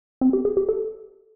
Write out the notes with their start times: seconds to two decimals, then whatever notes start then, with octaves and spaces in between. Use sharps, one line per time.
0.21 C4
0.33 G4
0.45 G#4
0.57 G4
0.69 A4